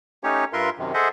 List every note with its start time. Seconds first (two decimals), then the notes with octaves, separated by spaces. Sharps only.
0.24 A3 C#4 D#4 G4 C#5
0.53 G2 F4 A#4 B4 E5 C6
0.78 F#2 C3 D#3
0.94 G#4 A4 C5 D#5 E5 F#5